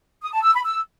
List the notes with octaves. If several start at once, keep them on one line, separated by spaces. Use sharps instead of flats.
D#6
A5
E6
B5
E6